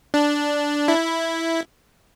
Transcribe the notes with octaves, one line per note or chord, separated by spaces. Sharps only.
D4
E4